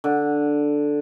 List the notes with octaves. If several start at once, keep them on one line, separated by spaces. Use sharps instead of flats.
D3